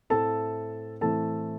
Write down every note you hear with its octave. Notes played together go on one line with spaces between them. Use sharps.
A2 A3 C4 A4 A5
A2 E3 A3 C4 A4 A5